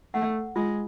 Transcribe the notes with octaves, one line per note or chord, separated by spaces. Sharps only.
A3 F#5
G#3 F4